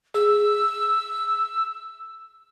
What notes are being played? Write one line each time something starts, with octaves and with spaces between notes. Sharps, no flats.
G#4 E6